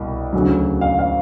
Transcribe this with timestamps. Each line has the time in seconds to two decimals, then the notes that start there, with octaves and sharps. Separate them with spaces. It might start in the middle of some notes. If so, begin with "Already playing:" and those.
Already playing: C2 B2 G3
0.33 D2 C#3 F#3
0.81 F5
0.99 F5